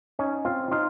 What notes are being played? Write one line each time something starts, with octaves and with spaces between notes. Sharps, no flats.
C#4 D#4 C#5
C4 F4 F5
D#4 F4 F5